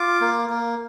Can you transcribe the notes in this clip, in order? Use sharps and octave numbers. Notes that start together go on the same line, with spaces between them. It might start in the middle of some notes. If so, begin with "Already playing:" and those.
Already playing: F4 D6
A#3
A#3